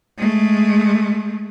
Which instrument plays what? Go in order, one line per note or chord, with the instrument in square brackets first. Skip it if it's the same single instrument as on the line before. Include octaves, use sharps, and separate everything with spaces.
[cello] G#3 A3